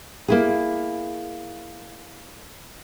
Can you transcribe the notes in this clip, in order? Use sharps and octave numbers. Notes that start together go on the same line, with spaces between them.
A#3 E4 G#4